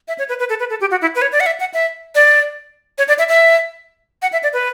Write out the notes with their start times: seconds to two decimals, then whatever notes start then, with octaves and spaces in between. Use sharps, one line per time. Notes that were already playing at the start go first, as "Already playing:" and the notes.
0.08 E5
0.19 C#5
0.29 B4
0.39 B4
0.49 A4
0.60 B4
0.70 A4
0.81 G4
0.91 F#4
1.02 E4
1.15 B4
1.22 C#5
1.32 D5
1.40 F#5
1.46 E5
1.60 F#5
1.74 E5
2.15 D5
2.98 C#5
3.08 D5
3.19 E5
3.29 E5
4.22 F#5
4.32 E5
4.43 D5
4.53 B4